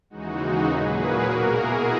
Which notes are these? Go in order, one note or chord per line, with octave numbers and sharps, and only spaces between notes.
D#2 C#3 E3 G#3 D#4 F#4
A#2 F#3 A#3 G#4 B4
F#4 A#4
B2 A#3
E4 G#4